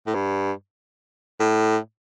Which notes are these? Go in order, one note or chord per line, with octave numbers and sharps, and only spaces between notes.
A2
G2
A2